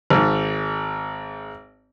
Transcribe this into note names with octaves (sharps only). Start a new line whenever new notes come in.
G#1 G#2